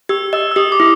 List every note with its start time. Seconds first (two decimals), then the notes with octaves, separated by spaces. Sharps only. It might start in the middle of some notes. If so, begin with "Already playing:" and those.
0.09 G4 E6
0.33 D#5 E6
0.51 E6
0.56 G4 D#6
0.72 D6
0.80 E4